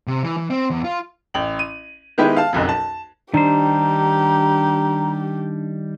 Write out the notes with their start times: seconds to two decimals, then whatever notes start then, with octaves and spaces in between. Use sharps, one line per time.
0.07 C3
0.23 E3
0.37 E3
0.50 C4
0.70 E2
0.84 F4
1.34 A1 G5 F#7
1.59 D#7
2.18 D#3 G#3 B3 E4 G4 B4
2.36 F5 A5
2.53 F#1 B1 F2
2.69 A5
3.34 D#3 G3 D4 G4 C5 A#5